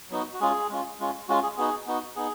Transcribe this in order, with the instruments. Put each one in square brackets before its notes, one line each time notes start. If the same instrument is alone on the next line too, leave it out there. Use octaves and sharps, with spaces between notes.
[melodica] F#3 B3 D#4 F#4
F#4
G#3 C#4 F4 G#4
G#3 C#4 F4
G#3 C#4 F4
G#3 C#4 F4 F#4
G#4
B3 D#4 F#4 G#4
B3 D#4 F#4
B3 D#4 G#4